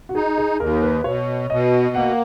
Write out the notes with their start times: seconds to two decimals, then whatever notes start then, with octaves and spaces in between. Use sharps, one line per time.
0.09 F#4
0.15 D#4 G#4
0.38 G#4
0.59 D#2 A#4
0.82 B4
1.04 B2 C#5
1.50 B2 D#5
1.95 A#3 F#5